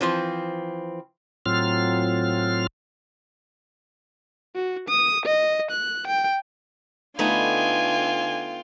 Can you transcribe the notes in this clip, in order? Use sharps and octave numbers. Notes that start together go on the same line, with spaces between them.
E3 F3 C4
A2 F#3 C4 F4 F6
F#4
D#6
D#5
F#6
G5
D3 A3 B3 D#4 F4 G5 G#5